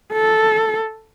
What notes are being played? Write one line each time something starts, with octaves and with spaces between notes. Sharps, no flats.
A4